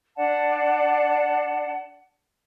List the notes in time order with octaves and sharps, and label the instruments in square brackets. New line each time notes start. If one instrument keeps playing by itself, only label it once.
[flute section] D4 D5 F#5 A5